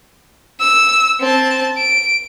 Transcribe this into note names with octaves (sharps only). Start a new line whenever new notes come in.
E6
C4 A5
D7